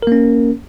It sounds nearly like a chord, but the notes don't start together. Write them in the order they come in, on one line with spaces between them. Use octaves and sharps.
A#4 A#3 C#4